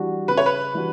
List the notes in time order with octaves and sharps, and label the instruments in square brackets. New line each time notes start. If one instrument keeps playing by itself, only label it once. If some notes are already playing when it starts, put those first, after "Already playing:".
Already playing: [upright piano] E3 G3 D4 F#4
[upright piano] C#3 [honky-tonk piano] B4
[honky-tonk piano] C#5
B4
[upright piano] E3 G3 D4 F#4